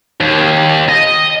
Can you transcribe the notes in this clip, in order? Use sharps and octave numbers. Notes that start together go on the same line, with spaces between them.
D#2
D#5